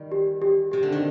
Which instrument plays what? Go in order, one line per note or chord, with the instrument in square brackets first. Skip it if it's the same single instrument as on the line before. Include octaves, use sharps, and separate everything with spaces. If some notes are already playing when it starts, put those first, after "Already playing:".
Already playing: [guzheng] D#3 G3
[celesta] G4
G4
[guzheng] C3 [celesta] G4
[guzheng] D3
D#3